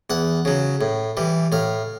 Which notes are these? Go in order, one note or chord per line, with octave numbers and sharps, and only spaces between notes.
E2 F#5
C#3 F#3
A2
E3 G3
A2 F5